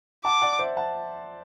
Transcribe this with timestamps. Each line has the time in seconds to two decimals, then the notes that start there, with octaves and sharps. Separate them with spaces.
0.25 F#5 A5 D6
0.42 D5 F#5
0.59 C5 E5
0.77 F#5 A5